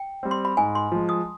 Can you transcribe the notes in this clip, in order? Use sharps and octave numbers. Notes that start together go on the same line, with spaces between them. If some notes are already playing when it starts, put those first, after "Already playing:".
Already playing: G5
G3 C4
C6
B5
G#2 G#5
C6
F3 G#3
D#6